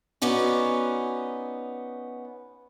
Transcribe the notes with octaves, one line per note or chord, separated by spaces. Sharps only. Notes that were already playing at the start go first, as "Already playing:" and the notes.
B3 C#4 D#4 F#4 D5